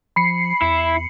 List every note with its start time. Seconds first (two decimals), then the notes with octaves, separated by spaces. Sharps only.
0.16 F3 B5 C7 C#7
0.62 E2 E4